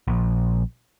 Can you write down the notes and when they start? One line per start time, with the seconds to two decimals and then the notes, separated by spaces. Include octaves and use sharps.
0.08 A#1